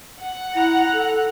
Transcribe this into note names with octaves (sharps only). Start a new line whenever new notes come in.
F#5
E4 A#5 F#6
A4